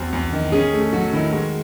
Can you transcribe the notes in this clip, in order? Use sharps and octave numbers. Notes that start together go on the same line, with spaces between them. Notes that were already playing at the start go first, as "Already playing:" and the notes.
Already playing: E2 C4 F#4
E2
D#3
C#4 G#4
A3
F#3 F#4
D#3 E4
G#3 F#4